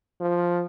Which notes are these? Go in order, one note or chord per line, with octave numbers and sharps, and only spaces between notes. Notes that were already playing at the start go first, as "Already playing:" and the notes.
F3